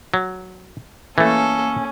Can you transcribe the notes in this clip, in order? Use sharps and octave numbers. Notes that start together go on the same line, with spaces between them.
F#3
E3 A3 A#3 C#4 A4